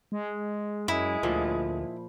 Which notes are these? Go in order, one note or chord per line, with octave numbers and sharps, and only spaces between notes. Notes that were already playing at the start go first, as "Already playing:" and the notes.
G#3
F#2 G#3 E4
D2 A#2 F3